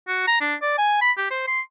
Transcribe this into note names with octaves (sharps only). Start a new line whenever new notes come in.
F#4
A#5
D4
D5
G#5
B5
G4
C5
C6